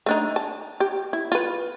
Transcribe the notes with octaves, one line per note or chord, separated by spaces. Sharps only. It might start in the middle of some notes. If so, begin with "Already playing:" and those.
A3 D4 D#4
A5
G4
E4
F4 B4